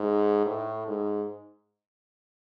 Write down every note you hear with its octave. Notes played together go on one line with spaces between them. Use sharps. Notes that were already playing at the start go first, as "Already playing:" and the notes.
Already playing: G#2
A2
G#2